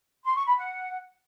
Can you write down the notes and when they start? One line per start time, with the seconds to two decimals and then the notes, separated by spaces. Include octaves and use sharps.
0.24 C6
0.35 C#6
0.46 B5
0.57 F#5